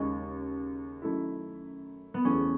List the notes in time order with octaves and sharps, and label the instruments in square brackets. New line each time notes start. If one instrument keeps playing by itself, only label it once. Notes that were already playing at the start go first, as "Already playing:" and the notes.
Already playing: [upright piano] D#2 C#3 G#3 D#4 [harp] C#4
[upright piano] F#2 D#3 A3 E4
[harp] B3
[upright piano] F#1 E2 C#3 E3 A3 [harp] C#4